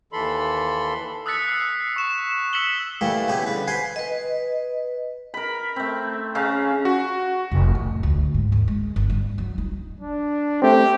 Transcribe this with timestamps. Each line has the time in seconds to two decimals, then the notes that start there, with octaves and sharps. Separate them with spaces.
0.13 D#2 E3 A4 B5 C6
1.26 D#6 E6 F#6 A6 B6 C#7
1.48 D#6 C7 C#7
1.96 C#6 E7
2.53 E6 B6 C#7 E7 F#7 G7
3.01 E3 G3 A3 A#3
3.28 C#3 B3 E4 G4
3.46 D3 B4
3.67 C5 F#5 G#5 B5 C6
3.96 B4 D#5
5.34 A#4 B5
5.76 A3 C4
6.35 C#3 C#4 F5 A#5
6.85 F#4
7.51 F1
7.75 A2
8.03 D2
8.34 G#2
8.52 D#2
8.68 G#3
8.96 G1
9.10 G3
9.38 F#3
9.58 D#4
10.00 D4
10.62 A3 C4 G4